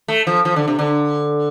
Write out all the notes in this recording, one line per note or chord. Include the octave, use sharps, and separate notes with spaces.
A3
F3
F3
D3
C3
D3